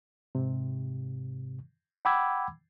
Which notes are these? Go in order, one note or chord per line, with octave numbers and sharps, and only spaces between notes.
G#2 C3
F#5 G5 B5 D6 E6 G#6